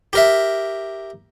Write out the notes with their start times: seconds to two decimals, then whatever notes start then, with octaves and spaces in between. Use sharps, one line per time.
0.13 G4 A#4 E5